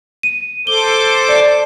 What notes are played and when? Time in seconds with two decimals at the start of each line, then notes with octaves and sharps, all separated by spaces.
0.23 D#7
0.67 A4 C5 D6 G7
1.29 D5